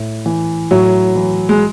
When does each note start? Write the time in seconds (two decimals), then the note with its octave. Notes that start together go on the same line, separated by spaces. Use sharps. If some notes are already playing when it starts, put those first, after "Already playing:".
Already playing: A2
0.26 E3
0.71 A2 F#3
1.16 E3
1.49 G#3